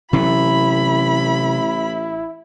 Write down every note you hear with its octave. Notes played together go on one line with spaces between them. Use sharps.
A1 C3 F#3 A3 E4 B5